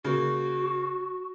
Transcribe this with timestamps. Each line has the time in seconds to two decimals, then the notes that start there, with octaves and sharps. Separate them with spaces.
0.04 C#3 A#3 F#4